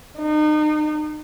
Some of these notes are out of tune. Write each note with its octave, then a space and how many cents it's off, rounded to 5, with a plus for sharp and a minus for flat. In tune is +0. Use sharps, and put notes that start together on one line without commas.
D#4 -35